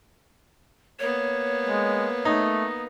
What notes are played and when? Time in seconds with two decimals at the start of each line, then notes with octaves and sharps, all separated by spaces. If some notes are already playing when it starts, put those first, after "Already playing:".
0.99 A#3 B3 C#5
1.63 G#3
2.25 A3 D#4